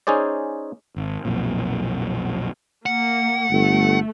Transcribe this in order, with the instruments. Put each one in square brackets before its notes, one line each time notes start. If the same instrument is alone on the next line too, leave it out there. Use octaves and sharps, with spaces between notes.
[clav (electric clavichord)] C#4 D#4 G#4 C5 D5
[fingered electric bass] G#1
B1 F2 A#2
[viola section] A#3 [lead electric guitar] F#5
[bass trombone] G1 [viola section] A3